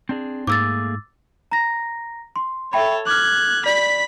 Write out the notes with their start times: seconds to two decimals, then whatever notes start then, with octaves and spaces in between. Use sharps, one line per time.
0.09 C4 D4 G#4
0.47 G#2 A3 A#3 G#4 D6 E6 A6
1.52 A#5 A#6
2.36 C6
2.73 A4 C#5 E5 G5 B5
3.07 D6 F6 F#6 G#6
3.66 D5 B5 B6